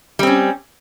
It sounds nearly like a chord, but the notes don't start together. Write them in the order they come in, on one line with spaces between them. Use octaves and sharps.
G3 C4 C#4